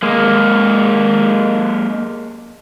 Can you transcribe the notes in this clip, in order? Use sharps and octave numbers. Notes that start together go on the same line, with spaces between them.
G#3 A#3